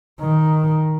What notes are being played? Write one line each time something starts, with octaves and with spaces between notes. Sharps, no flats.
D#3